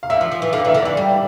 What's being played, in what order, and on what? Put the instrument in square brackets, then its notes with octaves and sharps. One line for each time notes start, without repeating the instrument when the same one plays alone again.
[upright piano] F5
[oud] D3 [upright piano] E5
[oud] F3
F3
E3
[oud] D3 [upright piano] F5
[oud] E3
[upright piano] E5
[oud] D3
[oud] E3 [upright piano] D5
[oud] G3